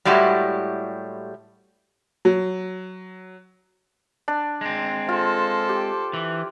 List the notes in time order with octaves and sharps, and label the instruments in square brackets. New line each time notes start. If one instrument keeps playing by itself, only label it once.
[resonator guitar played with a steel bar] A2 G3 G#3 E4 F#4 G4
[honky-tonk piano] F#3
[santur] D4
[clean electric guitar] G#3 C4
[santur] F4 [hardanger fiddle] A4 C5
[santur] G4
[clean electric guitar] E3